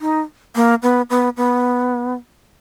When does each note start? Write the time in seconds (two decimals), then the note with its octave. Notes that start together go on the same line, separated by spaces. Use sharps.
0.01 D#4
0.55 A#3
0.82 B3
1.10 B3
1.37 B3